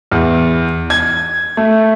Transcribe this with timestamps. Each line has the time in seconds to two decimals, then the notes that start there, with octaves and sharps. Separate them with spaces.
0.11 E2
0.90 G#6
1.57 A3